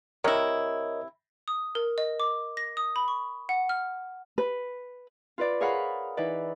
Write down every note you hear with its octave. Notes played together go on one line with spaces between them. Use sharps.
C3 E4 A#4 C#5 D#5
D#6
A#4
D#5
D6
A#6
D#6
B5
C#6
F#5
F6
B4
F4 B4 D5
G#4 A#4 C#5 F5 F#5 B5
E3 D#4 E4 B4 D5